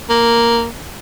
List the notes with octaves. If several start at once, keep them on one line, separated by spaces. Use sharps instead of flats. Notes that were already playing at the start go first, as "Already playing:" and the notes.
A#3